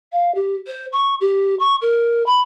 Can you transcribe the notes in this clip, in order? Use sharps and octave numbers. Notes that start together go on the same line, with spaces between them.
F5
G4
C5
C#6
G4
C#6
A#4
B5